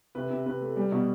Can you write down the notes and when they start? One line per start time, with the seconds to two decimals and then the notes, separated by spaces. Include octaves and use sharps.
0.15 C3 B4
0.30 C3
0.46 C3 B4
0.61 A3
0.77 G3
0.92 B2